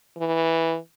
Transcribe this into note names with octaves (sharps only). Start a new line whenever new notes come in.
E3